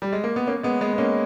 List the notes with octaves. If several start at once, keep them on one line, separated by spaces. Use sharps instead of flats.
G3
G#3
A#3
B3
A#3 C#4
G#3 B3
G#3 B3
B3
A#3 C#4